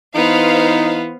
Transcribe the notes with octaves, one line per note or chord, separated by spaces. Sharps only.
E3 B3 D#4 B4 C5 F5